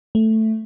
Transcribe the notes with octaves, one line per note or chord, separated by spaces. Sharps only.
A3